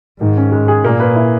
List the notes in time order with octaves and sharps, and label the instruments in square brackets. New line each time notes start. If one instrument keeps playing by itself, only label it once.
[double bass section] G#2 [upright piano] D#3
[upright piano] C#4
G#3
G#4
[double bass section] A#2 [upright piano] A#3
[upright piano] B4
E4